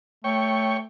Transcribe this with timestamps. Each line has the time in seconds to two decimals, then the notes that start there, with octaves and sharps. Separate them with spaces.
0.24 A3 C#5 G5 C#6